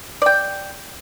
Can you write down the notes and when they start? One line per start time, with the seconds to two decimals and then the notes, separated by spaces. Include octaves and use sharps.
0.22 D5 G5